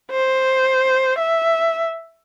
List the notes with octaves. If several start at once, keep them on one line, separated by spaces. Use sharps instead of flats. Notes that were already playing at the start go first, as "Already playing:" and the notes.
C5
E5